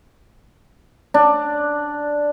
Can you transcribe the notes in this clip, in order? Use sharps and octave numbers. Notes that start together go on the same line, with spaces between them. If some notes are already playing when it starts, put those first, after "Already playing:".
D4